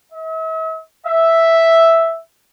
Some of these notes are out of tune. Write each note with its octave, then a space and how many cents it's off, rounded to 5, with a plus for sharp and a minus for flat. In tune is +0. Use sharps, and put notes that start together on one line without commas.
E5 -45
E5 +0